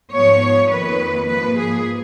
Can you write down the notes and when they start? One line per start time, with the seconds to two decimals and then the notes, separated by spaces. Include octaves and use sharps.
0.12 G#2 F3 B3 C#5
0.70 F2 D#3 A#3 B4
1.28 G#2 F3 A#3 B4
1.57 G#4